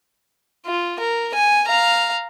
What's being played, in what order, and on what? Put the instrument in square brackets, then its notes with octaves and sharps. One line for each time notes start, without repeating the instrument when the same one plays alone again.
[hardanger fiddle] F4
A#4
G#5
F5 A#5